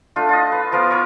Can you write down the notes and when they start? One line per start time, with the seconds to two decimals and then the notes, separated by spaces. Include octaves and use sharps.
0.16 A3 D4 F4
0.29 F4 D#5
0.52 B4
0.72 F3 B3 A#4 F5
0.90 A#4 C#5